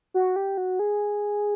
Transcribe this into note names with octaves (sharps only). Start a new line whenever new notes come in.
F#4
G4
F#4
G#4